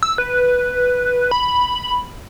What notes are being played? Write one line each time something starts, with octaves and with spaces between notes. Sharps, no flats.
E6
B4
B5